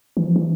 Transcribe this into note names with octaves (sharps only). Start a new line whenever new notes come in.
E3
F3
E3